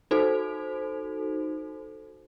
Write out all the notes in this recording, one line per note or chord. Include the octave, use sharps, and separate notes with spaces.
D#4 F#4 A4 C5